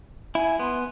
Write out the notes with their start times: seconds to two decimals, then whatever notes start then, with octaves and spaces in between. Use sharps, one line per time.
0.35 E4 G#5
0.60 B3 C6